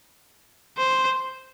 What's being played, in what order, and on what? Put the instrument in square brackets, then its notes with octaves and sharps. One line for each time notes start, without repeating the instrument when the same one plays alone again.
[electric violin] C5